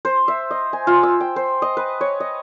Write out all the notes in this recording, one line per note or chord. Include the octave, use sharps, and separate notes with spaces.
C5
E5
D#5
G#5
F4
E6
G5
C5
D#5
B4
C#5
D#5